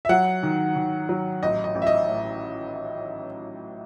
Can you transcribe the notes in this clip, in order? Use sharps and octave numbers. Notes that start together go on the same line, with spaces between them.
E5
F#3 F#5
D#3
D#3
F#3
A1 D#5
D#5
A1
E5
D#5
A2